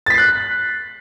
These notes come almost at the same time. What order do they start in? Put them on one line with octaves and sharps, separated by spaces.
A6 B6 C7 F#6